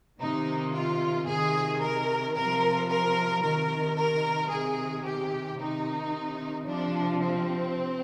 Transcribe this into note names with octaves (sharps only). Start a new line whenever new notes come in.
C3 D#3 D#4
F4
C3 D#3 G#4
A#4
C3 F3 A#4
A#4
C3 D#3 A#4
A#4
C3 D#3 G#4
G4
C3 D#3 D#4
C3 F3 D4
C4